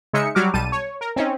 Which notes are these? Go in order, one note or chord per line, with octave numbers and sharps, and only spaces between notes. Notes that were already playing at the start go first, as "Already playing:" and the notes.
C#3 G#3 D#4 E5 C#7
F#3 G3 F#4 D6 F6
B1 G3 A5 D#7
C#5
A#4
C4 C#4 D#4